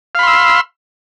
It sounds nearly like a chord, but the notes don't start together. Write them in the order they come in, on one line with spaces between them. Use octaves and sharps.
F5 B5 C6 E6